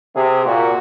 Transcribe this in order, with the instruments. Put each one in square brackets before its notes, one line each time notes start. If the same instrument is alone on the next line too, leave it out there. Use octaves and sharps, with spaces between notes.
[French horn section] C3 [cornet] G#4
[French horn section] A#2 [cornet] F#4